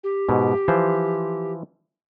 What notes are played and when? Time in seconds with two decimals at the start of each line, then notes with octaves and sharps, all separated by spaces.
0.04 G4
0.29 G#2 B2
0.68 E3 F3 C5